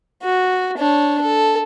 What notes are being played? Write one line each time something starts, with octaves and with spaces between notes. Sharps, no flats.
F#4
D4 C#5
A4